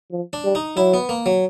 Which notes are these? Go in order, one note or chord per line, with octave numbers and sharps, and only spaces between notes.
F3
D4
G3
D#4
F#3 E4
B3
A#3
F#3